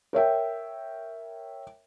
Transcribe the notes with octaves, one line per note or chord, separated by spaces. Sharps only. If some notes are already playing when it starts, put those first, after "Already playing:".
A#4 C#5 E5 G5